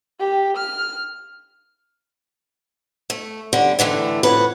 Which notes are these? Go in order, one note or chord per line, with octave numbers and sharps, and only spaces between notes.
G4
F6
A3
D3 G3
A2 D3 E3 A3
F2 A2 B4 F#5